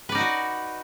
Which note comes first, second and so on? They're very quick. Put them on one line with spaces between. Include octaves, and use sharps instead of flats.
B4 D5 D#4 F#5 F#4